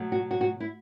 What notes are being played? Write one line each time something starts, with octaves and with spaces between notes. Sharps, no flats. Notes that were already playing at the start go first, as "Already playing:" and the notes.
Already playing: B2 F#3 A3
F#4
F#4
F#4
E4